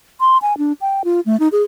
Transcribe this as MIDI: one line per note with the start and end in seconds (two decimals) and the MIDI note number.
0.20 0.38 84
0.42 0.56 80
0.58 0.73 62
0.81 1.02 79
1.05 1.21 65
1.26 1.39 57
1.40 1.48 63
1.52 1.63 68